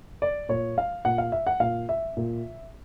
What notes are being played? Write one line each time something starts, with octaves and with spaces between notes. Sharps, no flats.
D5
A#2 C#5
F5
A#2 F#5
F5
E5
F#5
A#2 F5
E5
A#2